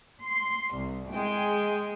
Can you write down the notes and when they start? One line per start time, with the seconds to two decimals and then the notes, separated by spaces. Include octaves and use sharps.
0.23 C6
0.76 C2
1.14 G#3 G#4 G5